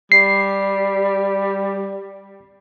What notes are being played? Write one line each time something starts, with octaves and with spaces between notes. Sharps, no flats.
G3 C7